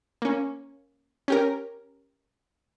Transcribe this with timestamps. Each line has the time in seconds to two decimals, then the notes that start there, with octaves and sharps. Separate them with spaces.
0.22 A#3 C#4
1.28 C#4 G4 A#4